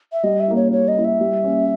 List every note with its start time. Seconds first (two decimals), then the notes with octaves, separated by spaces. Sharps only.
0.13 E5
0.23 G3 D#5
0.40 E5
0.48 A#3 E4
0.56 C#5
0.72 G3 C#5
0.88 D#5
0.96 A#3 E4
1.05 E5
1.20 G3
1.44 A#3 C#4